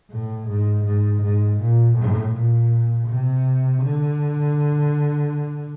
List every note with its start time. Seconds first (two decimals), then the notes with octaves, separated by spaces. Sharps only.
0.11 A2
0.48 G#2
0.85 G#2
1.22 G#2
1.59 A#2
1.96 A2
2.34 A#2
3.08 C3
3.82 D3